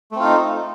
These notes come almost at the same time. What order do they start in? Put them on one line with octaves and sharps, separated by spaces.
A3 C4 F4 D#4